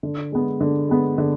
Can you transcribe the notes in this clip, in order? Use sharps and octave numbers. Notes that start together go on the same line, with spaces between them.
D3
G#3 B3
D3
G#3 B3
D3